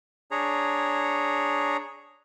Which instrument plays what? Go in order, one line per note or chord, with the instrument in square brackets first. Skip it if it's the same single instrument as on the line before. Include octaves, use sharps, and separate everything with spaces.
[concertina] D4 G#4 C#5 A#5